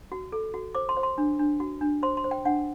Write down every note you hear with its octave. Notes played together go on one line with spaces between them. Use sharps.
F#4
A4
F#4
C5 D6
C6
C5
C6
D4
D4
F#4
D4
C5 C6
C6
C5
G5
D4 F#5